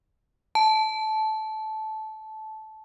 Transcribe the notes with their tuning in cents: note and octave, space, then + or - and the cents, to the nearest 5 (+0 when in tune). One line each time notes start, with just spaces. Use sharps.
A5 -15